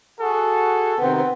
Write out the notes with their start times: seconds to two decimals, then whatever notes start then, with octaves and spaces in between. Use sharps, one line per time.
0.20 F#4 G#4 A4
0.99 C3 D#3 B3 C4